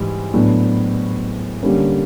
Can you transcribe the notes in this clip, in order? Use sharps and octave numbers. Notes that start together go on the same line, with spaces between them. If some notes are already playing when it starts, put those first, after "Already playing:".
Already playing: G#2 E3 G3
A2 F#3 B3 D4
D3 G3 A#3 C#4